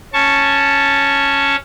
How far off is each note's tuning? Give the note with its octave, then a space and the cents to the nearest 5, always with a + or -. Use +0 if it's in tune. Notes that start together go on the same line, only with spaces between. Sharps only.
C#4 +0 A5 +0 C#6 +0